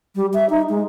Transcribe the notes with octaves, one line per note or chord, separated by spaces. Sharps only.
G3
E5
D#4
G#3